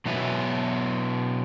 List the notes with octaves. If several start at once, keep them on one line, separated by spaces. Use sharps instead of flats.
B2 F#3 B3 E4